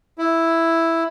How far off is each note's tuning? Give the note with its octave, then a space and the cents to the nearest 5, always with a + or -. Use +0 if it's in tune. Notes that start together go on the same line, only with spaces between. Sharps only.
E4 +0